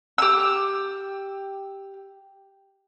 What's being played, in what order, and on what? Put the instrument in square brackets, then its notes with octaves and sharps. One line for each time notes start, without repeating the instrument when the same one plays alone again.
[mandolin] G4 E6